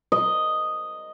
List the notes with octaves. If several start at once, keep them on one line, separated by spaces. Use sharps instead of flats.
D#5